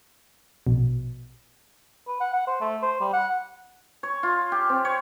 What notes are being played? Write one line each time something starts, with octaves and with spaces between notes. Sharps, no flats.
A#1 B2
B4
F#5
F#5
C5
A3
C5
G3
F#5
C#5
F4
G4
C4
C#5